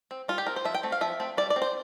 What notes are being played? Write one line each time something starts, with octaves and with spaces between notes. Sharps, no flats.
C4
G3 F4
G4
C4 A#4
C5
F3 E5
G5
A3 C4
F5
F3 E5
A3 C4
G3 D5
D5
C4
C5